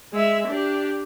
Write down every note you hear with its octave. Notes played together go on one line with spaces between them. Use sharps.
G#3 E5
D4 G4